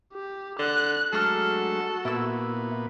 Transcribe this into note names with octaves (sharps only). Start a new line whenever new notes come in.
G4
D3 F#6
F#3 G#3 A3 D4 F#4 A4 A#5 F6
A#2 B3 E4 E6